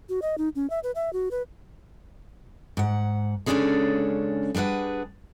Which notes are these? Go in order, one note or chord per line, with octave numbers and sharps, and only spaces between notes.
F#4
D#5
D#4
C#4
E5
B4
E5
F#4
B4
G#2 F#5
C#3 G#3 C#4 D4 G#4 A4
G3 D4 G#4 B4 F#5